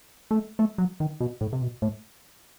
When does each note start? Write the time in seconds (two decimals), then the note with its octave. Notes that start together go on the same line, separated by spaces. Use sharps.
0.31 A3
0.59 A3
0.78 F#3
1.00 D#3
1.20 B2
1.41 A2
1.53 C3
1.62 B2
1.82 A2